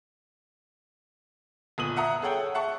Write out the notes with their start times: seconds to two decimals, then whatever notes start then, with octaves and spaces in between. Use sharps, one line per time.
1.78 G1 A#2 D#6 D#7 F#7
1.96 E5 F#5 A#5 D#6
2.22 G#4 A4 C#5 F#5 G5
2.54 E5 F#5 A5 C#6